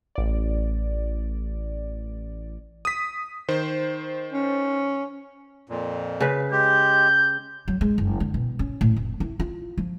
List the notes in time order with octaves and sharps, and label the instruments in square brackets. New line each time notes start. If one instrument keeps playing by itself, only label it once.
[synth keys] A1 D5
[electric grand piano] D#6 B6
D#3 C5
[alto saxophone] C#4
[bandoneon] F2 A#2
[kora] C#3 B4
[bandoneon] G#3 G4 [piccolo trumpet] G6
[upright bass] F#3
G#3
F#1
D3
B2
C#4
A2
F1
E4
F4
F3